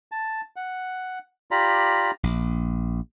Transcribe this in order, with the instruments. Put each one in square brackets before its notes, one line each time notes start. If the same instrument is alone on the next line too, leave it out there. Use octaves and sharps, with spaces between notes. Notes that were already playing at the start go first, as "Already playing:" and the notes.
[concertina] A5
F#5
F4 G4 D5 A#5 B5
[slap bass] A#1